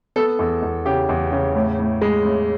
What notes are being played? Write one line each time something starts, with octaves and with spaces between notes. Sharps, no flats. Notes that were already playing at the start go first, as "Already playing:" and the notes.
B3 A4
E2 A4
E2
C#3 G4
E2
C#3
A2
A2
G#3
A2